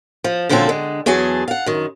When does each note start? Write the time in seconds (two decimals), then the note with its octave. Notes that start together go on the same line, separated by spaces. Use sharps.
0.24 F3
0.49 A#2 D3 F3 F#3 C4 A4
0.69 D3 G#3
1.06 E2 F#3 G#4 G#5 A5
1.48 F5 F#5
1.66 F#2 D#3